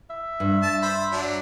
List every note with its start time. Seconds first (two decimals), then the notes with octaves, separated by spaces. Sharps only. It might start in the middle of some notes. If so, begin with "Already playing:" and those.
0.10 E5
0.40 G2
0.63 A5
0.82 C5 B5
1.12 F#3 D4